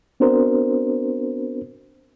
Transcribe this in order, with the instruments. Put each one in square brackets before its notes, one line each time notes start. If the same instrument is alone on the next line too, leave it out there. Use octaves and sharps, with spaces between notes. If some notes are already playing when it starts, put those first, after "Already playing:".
[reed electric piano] B3 C4 D4 F#4 A#4 C5